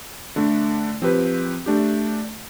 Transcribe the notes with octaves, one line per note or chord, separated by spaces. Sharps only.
D3 A3 D4
F3 C4 G4 B4
A3 D4 G4